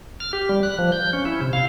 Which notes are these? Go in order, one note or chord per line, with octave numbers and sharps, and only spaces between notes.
F6
G4
G3
F#6
F3
G6
C#4
E4
C3
F5